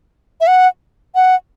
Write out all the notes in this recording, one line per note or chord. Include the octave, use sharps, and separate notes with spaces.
E5
F#5
F#5